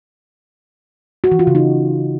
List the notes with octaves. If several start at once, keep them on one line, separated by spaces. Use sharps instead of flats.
F#4
E3
F4
C#3
D#4